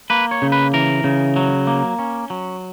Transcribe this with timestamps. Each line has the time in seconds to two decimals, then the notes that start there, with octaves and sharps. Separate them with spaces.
0.10 A#3 B4
0.31 C#5
0.42 C#3
0.52 B4
0.74 E3 A#4
1.04 C#3
1.36 F#3
1.67 A#3
1.99 C#4
2.30 F#3